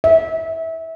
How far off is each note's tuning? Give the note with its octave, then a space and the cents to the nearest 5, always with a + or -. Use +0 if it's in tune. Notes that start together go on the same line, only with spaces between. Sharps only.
E5 -20